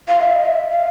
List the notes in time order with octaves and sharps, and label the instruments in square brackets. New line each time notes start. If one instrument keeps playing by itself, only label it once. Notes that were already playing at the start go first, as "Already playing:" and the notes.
[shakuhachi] F5
E5
D#5
E5
F5